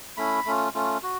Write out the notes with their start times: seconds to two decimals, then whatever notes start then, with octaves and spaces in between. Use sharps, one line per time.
0.17 A3 C#4 E4 B5
0.46 A3 C#4 F4
0.75 A3 C#4 F4
1.03 F#4